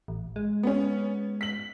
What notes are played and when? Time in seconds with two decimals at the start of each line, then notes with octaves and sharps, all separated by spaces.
0.08 A1
0.36 G#3
0.63 B3 C#4
1.41 B6 F#7